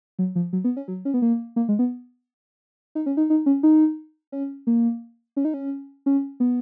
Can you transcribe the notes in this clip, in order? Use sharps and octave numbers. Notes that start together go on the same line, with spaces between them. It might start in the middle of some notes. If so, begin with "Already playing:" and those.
F#3
F3
F#3
B3
C#4
F#3
C#4
B3
A#3
A#3
G#3
B3
D#4
C#4
D#4
D#4
C#4
D#4
C#4
A#3
C#4
D#4
C#4
C#4
B3